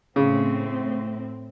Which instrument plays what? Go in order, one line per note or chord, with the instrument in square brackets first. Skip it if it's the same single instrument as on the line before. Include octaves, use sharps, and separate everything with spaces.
[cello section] A2 C4 [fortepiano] C#3